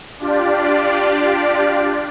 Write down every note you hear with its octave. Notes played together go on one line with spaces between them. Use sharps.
D4 F4 G4 D5